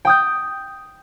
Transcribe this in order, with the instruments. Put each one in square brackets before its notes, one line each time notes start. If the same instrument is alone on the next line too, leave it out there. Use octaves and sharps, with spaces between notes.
[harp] G5 D#6 G6